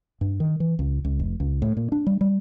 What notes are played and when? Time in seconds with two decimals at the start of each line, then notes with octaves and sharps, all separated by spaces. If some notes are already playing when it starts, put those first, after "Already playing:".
0.21 G2
0.40 D#3
0.60 E3
0.79 C#2
1.05 C#2
1.19 F1
1.40 C#2
1.62 A2
1.77 A#2
1.92 D4
2.07 G3
2.21 G3